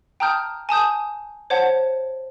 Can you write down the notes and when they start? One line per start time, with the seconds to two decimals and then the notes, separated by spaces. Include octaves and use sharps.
0.20 G5 A5 A#5 D#6 F6 G6
0.69 G#5 A5 D#6 G6
1.50 C5 C#5 F#5 A5